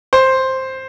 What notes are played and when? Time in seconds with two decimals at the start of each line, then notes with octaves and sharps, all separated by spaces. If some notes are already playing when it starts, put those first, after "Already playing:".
0.13 C5